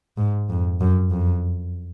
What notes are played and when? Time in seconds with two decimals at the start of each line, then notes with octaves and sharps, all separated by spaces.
0.18 G#2
0.50 F2
0.81 F#2
1.11 F2